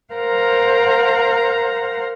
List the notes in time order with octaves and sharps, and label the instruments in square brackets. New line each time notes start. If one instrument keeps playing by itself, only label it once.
[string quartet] A#4 C5 F5 F#5 A#5